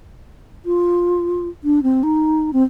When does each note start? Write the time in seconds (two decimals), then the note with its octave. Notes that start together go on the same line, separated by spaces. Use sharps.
0.66 F4
1.64 D4
1.83 C4
2.03 D#4
2.53 C4